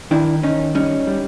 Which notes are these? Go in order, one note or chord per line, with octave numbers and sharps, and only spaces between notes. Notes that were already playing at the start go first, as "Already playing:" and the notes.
D#3 D4 E4
D#3 C#4 D#4
G3 C#4 D#4
G3